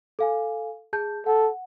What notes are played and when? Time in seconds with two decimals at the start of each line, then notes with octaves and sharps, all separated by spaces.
0.19 A4 F5 G#5
0.93 G#4 A5 G6
1.26 A4 F#5